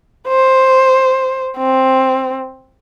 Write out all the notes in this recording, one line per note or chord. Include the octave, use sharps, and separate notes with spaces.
C5
C4